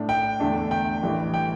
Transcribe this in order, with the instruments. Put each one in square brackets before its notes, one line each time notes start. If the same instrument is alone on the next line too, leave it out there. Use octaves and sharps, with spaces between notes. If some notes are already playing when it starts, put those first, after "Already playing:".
Already playing: [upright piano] A2 A3 D4
[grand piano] G5
[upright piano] E2 D3 A3 D4
[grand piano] G5
[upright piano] A1 A2 E3 G3
[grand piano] G5